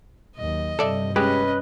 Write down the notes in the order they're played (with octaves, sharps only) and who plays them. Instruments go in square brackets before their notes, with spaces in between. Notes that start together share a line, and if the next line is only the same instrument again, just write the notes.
[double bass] D#2 F#3 [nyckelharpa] D#5
[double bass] G2 C3 [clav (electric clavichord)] A4 D5 E5
[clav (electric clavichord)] G#3 G4 [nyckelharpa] C#4 D#5 [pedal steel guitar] B4